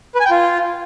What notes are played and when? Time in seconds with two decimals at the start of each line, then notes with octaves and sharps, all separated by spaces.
0.15 B4
0.20 G#5
0.25 G5
0.30 F4